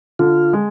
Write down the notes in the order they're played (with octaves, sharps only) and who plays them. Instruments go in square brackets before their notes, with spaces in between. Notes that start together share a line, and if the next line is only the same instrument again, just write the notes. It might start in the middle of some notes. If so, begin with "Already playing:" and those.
[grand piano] D3 [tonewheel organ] F4
[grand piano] G#3